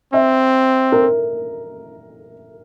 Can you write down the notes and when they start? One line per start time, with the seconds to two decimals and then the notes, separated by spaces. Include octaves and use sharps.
0.13 C4 E5
0.92 A#4